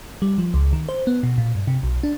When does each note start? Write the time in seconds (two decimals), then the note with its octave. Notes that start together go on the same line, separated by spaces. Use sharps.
0.22 G3
0.38 F3
0.54 C#2
0.73 D#3
0.89 C5
1.07 B3
1.23 B2
1.38 A#2
1.55 G2
1.67 C3
1.83 B1
2.03 D4